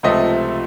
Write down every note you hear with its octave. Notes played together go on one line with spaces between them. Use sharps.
C#2 C3 F3 A3 D#5